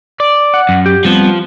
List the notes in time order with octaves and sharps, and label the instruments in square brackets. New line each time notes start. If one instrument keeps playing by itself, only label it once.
[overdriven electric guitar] D5
[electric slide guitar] F#5
[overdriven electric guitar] F#2
[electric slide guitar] G4
[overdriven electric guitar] F3 [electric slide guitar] G3 B3 C4